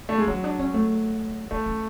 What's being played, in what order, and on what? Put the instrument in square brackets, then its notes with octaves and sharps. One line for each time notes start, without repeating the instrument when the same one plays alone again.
[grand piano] A3
G#3
[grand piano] F#3 [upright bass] C#4
[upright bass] D4
C#4
A3
[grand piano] A3 [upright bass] B3
[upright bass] C#4